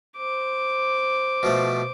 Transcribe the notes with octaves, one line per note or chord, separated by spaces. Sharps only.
C5 D6
B2 F3 A3